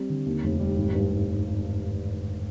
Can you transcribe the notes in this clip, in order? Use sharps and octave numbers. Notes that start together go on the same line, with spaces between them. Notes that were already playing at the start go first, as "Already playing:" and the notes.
Already playing: G3 C4
D3
D#2
F1
G3
G#1
G2